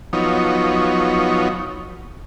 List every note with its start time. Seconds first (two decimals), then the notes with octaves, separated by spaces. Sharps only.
0.13 F3 F#3 B3 D#4 C#5